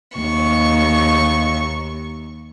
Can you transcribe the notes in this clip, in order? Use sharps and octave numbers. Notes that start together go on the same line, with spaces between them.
D#2 C#6